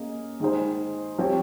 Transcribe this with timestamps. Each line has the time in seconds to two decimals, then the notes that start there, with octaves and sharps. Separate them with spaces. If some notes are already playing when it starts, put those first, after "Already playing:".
Already playing: A#3 C#4 G#4 D#5
0.40 D#3 G#3 D#4 G#4 C5
1.18 F3 C4 G4 C#5